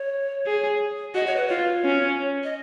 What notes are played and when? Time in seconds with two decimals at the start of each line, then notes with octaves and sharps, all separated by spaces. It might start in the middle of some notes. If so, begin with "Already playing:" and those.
Already playing: C#5
0.46 G#4
1.15 F#4 D#5
1.26 C#5
1.36 B4
1.48 F4 C#5
1.85 C#4
2.44 D#5